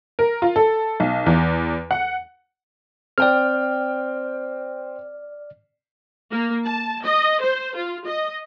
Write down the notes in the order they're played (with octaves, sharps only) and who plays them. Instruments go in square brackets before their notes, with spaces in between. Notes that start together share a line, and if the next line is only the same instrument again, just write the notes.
[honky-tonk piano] A#4
F4
A4
B1
E2
F#5
[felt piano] C4 G5 [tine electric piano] D5 F6
[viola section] A#3
A5
D#5
C5
F4
D#5